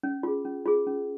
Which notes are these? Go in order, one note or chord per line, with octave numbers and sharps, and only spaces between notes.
C#4
F4 G#4
C#4
F4 G#4
C#4